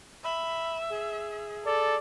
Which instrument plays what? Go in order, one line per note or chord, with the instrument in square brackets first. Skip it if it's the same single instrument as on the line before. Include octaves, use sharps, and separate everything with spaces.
[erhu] E5 [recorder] B5
[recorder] G#4
[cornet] A4 [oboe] D5